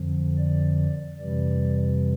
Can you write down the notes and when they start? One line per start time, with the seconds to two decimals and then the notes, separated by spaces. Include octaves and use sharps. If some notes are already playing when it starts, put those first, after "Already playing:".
Already playing: F2 D3 F3
0.37 D5
1.18 F2 C3 E3 G3 D5